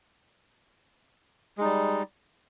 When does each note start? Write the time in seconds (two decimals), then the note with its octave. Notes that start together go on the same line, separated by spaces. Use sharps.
1.58 G#3
1.61 D#4
1.64 G3